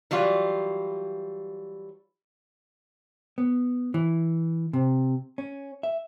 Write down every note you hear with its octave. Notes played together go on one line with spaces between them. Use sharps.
E3 F#3 G3 F4
B3
E3
C3
C#4
E5